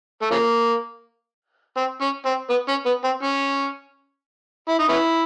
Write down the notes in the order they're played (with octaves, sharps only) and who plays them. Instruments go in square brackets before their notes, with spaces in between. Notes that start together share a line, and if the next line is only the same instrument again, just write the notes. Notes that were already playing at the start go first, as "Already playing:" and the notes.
[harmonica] A3
C#3 F3 A#3
C4
C#4
C4
B3
C#4
B3
C4
C#4
E4
D#4
B3 C#4 E4